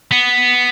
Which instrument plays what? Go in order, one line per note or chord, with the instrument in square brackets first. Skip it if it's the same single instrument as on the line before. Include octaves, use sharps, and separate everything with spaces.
[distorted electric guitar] B3